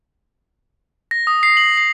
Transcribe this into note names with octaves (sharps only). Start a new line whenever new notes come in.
A#6
D#6
C7
F#7
C7